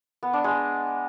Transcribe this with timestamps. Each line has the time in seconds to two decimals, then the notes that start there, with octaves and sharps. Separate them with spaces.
0.23 B3
0.33 D4
0.44 G#3